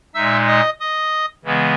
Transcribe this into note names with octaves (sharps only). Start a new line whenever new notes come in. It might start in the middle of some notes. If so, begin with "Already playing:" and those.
A#2 G#3 D#4 E5 E6
D#5 D#6
D#5 D#6
C#3 E3 G#3 B3